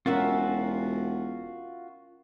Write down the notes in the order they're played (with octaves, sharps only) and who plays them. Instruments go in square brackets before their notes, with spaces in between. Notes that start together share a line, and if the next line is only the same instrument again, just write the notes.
[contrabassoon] E1 [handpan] C#4 A#4 F#5 [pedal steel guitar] F4 F#4 E5